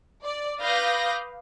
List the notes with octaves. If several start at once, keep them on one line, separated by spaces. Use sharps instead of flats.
D5
B4 F5 D6 D#6 G6 A#6